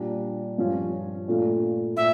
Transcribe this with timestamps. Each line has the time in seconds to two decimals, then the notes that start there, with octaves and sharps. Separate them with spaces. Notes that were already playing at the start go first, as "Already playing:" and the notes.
Already playing: A#2 G3 D4
0.58 G2 F3 C#4 F4
1.28 A#2 A3 D4 F4
1.97 A#2 E5